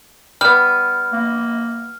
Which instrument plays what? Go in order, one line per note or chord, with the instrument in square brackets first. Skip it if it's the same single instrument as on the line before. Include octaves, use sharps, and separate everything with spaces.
[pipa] G3 B3 [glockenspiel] F6
[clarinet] A#3